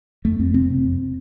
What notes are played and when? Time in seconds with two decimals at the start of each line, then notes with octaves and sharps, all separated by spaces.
0.25 F2 A3
0.39 F2 C4
0.54 C3 C4
0.70 C3
0.84 F2